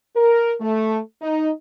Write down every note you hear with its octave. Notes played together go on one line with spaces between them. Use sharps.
A#4
A3
D#4